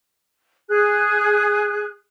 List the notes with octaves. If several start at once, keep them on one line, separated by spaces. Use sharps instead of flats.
G#4 F#6